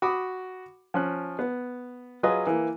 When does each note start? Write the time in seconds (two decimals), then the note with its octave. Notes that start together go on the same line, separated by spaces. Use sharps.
0.02 F#4 B5 D6 D#6
0.94 F3 C#4 F#6
1.39 B3
2.23 F#3 F4 G#4 B4 D#5
2.47 E3 A#3